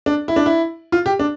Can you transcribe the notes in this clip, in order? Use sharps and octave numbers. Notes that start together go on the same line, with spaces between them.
D4
E4
D4
E4
F4
G4
D4